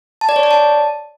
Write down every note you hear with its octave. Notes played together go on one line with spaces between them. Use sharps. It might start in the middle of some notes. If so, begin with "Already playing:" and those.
A5
D5
C#5
D5
A5